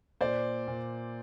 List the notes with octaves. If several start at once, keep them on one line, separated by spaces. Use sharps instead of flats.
A#2 C5 D5
A#2